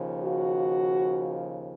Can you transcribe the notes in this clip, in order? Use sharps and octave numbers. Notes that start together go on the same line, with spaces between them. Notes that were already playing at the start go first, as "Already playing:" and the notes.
Already playing: D#2 C#3 F3
F#4